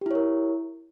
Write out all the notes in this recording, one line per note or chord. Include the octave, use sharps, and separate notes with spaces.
E4 G4 A#4 C#5